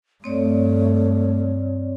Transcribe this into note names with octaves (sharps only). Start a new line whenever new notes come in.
G2 A3 C4 C#5 D5